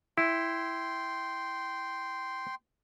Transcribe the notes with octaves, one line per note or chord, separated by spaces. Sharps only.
E4 G5 C6